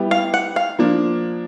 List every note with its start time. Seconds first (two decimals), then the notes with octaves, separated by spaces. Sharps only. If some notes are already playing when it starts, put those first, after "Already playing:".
Already playing: G3 B3 E4 G4
0.11 F5
0.34 F#5
0.56 F5
0.79 F3 A#3 D4